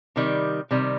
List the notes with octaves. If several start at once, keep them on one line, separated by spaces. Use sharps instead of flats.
C3 D#3 G3
C3 D#3 G3